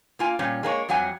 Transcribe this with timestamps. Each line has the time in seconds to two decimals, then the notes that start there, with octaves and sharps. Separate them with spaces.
0.19 A#3 F4 G#5
0.39 A#2 G3 C#4
0.63 G#3 A#3 D4 C#5
0.89 F2 F#3 G3 F#5 G#5